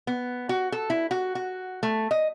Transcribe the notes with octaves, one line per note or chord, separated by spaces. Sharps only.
B3
F#4
A4
E4
F#4
F#4
A3
D#5